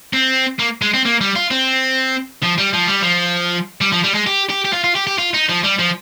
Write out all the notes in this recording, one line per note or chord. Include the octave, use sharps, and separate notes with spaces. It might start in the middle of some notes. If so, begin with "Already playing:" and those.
C4
A#3
G#3
C4
A#3
G3
F4
C4
F3
G3
F3
G3
F3
G3
F3
G3
G#3
G4
G4
G4
F4
F4
G4
G4
F4
D#4
F3
G3
F3